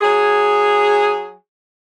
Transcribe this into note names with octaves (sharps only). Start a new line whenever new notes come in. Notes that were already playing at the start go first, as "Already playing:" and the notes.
F#3 G#4